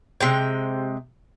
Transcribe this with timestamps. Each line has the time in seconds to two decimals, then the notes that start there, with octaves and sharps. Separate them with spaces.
0.20 C3 G#3 G5